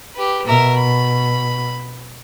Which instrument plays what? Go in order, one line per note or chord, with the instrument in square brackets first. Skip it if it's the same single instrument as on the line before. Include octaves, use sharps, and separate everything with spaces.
[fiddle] G4 B4
[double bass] B2 [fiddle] A#4 E5
[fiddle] B5